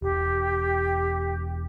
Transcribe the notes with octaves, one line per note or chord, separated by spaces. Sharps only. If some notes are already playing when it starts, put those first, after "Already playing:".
E1 G4